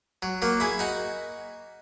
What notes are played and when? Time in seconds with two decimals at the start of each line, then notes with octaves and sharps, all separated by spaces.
0.22 F#3
0.42 F#3 A#3
0.60 E4 G#4
0.79 D#4 F#4